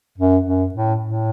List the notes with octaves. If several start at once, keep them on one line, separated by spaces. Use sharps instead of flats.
F#2
F#2
A2
A2